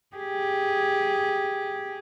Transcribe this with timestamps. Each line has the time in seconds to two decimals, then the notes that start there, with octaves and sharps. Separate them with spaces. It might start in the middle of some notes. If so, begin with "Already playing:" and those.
0.16 G4 G#4